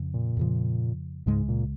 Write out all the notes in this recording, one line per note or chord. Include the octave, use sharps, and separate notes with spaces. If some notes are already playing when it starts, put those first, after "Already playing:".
Already playing: F2 C#3
A#2
F2 C#3 F3
C#2 G#2 C#3 G#3
A#2